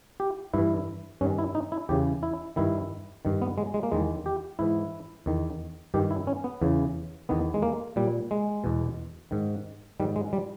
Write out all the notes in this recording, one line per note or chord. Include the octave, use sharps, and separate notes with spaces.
G4
G2 E3 E4
G2 D#3 C#4
E4
D#4
E4
E2 C#3 E3 G4
E4
G2 D#3 E4
G2 D#3
B3
G#3
G#3
A#3
E2 D#3 G#3
G4
G#2 E3 E4
E2 D#3
G2 D#3 G4
E4
C#4
B3
E2 C#3 E3
E2 D#3 B3
G#3
A#3
A#2 G3
G#3
E2 B2
G#2 D#3
G#2 D#3 G3
G#3
G3